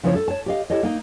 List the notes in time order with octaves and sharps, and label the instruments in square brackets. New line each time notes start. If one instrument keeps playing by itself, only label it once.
[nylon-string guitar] C#3 F3 B3 E4 C5 C#5
A4
C#5 A5
G4 D#5 F5
E4 G4 A4 C#5 D#5
A#3 D#4